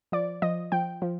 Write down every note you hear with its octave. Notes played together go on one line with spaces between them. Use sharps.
F3 D5
F3 D#5
F3 G5
F3